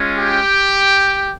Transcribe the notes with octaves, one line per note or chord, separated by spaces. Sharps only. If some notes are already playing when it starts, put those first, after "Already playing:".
Already playing: G#3 C#4 F4
G4 G5